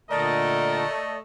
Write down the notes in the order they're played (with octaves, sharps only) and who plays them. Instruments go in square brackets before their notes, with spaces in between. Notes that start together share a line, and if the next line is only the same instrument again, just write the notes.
[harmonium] A#2 D3 [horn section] A3 D#5 [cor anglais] A#4 [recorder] D5